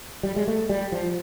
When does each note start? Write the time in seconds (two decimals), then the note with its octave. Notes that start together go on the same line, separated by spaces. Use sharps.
0.23 G3
0.36 G#3
0.48 A3
0.69 G3
0.92 F3